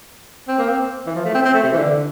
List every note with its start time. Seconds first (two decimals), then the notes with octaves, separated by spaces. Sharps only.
0.48 C4
0.58 A#3
0.70 C4
1.06 E3
1.15 F3
1.25 A3
1.35 C4
1.45 C4
1.54 A3
1.64 C3
1.73 E3
1.78 D3